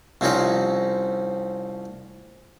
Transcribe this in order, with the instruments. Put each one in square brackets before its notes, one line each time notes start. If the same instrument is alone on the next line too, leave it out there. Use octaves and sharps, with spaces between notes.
[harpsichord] C2 F3 C4 C#4 D#4 D#5